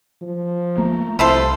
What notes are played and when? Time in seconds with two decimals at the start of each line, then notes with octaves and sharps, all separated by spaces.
0.22 F3
0.78 A3 A#3 A#5
1.19 C2 E4 F4 A4 C5